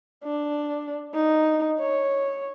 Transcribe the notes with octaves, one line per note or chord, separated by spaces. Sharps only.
D4
D#4
C#5